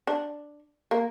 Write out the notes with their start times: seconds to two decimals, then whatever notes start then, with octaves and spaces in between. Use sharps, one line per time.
0.07 D4
0.91 A#3